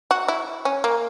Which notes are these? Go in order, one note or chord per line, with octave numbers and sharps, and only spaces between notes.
F#4
E4
C#4
A#3